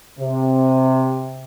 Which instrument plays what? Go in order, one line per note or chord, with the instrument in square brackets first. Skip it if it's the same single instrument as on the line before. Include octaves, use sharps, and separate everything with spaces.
[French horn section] C3